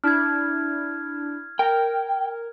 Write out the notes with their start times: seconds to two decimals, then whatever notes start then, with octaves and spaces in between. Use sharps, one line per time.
0.04 D4 E4 F6 G#6
1.59 A#4 G5